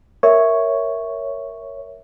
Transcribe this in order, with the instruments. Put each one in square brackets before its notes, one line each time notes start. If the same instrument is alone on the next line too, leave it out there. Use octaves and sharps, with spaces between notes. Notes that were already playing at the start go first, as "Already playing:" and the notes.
[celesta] A#4 E5 [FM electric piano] C#5